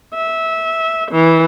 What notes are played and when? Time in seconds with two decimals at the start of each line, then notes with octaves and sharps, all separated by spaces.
0.13 E5
1.11 E3